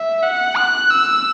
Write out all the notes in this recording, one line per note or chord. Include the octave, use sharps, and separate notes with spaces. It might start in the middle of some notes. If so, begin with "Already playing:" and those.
Already playing: E5
F#5
F#6
E6